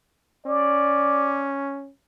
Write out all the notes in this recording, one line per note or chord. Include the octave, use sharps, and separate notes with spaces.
C#4 D5